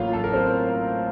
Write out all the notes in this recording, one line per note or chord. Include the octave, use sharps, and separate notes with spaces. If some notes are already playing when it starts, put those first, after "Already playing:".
Already playing: A1 A2 F#3 A#3 C#4 F4 F5
A4
A#4
C4 C5